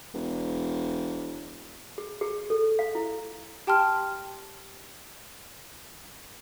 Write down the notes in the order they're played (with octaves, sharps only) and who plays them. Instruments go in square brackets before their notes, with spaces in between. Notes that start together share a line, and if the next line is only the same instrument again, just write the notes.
[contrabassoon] E1
[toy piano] G#4
G#4
A4
F5
E4
[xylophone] G4 G5 A5 C6 F6